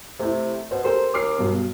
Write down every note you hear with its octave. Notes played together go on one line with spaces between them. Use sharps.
C3 A3 E4
B2 C5
G4 A4 A#4 C5
D#2 D6 F6 C7
B1 G2 B2